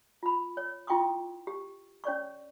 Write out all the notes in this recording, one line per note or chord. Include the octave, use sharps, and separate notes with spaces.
F4 B5
C#5
E4 F4 G5 C6 C#6 D#6
G4
C#4 C#5 D5 C#6